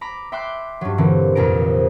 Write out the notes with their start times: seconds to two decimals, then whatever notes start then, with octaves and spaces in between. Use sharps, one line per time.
0.01 A#5 B5 D6
0.32 E5 G5 B5 C6 D6 F#6
0.81 G2 F#3
0.98 A#2 D3 E3 C4
1.35 C2 F2 A#2 D4 A#5 D7